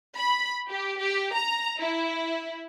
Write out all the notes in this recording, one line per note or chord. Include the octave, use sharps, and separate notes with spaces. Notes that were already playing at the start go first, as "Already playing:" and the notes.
B5
G4
G4
A#5
E4